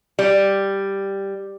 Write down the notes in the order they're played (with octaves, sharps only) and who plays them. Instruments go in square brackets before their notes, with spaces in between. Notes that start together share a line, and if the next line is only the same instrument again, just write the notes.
[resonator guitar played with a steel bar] G3